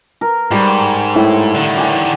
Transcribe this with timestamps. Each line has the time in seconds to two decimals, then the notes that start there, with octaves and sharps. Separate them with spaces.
0.21 A#4
0.51 G#2 G3 B5 C#6
1.16 A2 E4
1.55 D3 D#3
1.77 G4 G#4